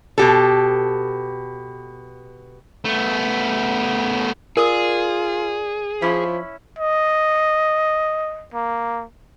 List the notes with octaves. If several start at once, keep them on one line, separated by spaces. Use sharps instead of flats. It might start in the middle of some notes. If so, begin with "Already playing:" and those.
B2 G4 A4
A3 B3
F4 G#4 A#4 D5 D#6
F3 C#4 E4 B5
D#5
A#3